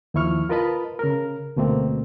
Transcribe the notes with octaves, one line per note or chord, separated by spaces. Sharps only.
D#2 F3 E4 C#6 F6
F4 A#4 B4 D#5 A5 B5
C#3 A#4
D2 B2 A3 A#3 C4